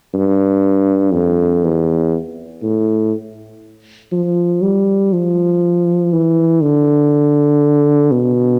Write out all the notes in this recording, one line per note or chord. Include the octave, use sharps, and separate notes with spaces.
G2
F2
E2
A2
F3
G3
F3
E3
D3
B2